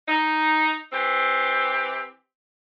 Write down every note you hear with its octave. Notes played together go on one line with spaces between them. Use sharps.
D#4
E3 C4 G4